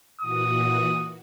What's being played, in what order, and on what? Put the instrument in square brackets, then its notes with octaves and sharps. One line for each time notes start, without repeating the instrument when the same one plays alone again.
[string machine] A#2 E3 F#4 [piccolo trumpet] D#6